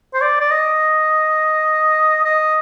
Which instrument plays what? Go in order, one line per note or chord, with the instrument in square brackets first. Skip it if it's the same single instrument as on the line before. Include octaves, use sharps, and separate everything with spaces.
[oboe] C5
D5
D5
D#5
D#5